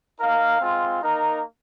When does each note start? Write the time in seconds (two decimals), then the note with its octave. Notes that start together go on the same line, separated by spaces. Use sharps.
0.19 D#4 A#4 F5
0.61 G#3 C4 F4
1.02 A#3 D#4 A#4